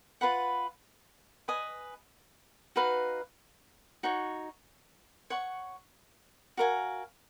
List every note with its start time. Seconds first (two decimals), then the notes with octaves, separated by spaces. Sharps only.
0.21 F4 B4 F#5 B5
1.48 B4 D#5 G#5 D#6
2.76 D#4 F#4 B4 F5
4.03 D#4 F#4 C#5
5.30 C#5 F#5 C#6
6.57 F#4 A#4 F5 G#5